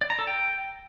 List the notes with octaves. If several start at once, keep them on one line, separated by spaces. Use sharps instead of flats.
D5
A#5
A4
G5